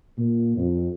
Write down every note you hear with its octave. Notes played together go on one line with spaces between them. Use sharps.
A#2
F2